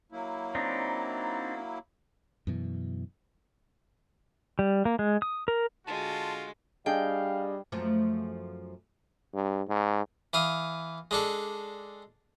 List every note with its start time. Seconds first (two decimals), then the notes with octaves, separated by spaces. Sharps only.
0.12 F#3 A#3 E4
0.55 C4 D4 D#4
2.47 F#2 B2 E3
4.59 G3
4.85 A#3
4.99 G#3
5.22 D#6
5.48 A#4
5.87 D3 G#3 F4 F#4 A5
6.86 G3 D4 G#4 D#5 F5 G5
7.72 F#2 F3 A3
9.34 G2
9.68 G#2
10.33 E3 F5 D#6
11.11 G#3 D4 A4